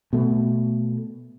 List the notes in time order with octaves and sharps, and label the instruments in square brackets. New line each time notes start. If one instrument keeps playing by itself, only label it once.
[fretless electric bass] B2 A3